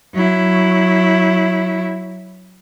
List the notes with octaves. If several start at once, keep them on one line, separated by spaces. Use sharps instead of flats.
F#3 E4